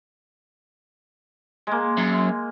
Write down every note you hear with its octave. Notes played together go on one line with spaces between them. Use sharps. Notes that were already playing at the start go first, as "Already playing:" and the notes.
G#3 A#3
F#2